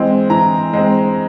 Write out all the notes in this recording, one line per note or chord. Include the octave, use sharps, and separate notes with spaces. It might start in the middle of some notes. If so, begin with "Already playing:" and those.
Already playing: E3 G#3 C4
E3 A#5
G#3 C4